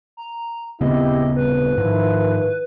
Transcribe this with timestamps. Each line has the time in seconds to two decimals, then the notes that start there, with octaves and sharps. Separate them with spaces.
0.17 A#5
0.81 D#1 C#3 B3 C4 E4 G4 D#5
1.36 G1 C2 B4
1.78 G#2 D#3 F3 E4